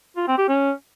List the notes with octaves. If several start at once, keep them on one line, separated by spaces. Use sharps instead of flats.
F4
C4
G4
C#4